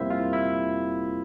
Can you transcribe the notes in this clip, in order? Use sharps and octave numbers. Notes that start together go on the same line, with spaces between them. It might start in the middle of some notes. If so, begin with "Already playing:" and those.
Already playing: F2 C3 G3 A#3 C4 E4 C5 E5
F4 F5
E4 E5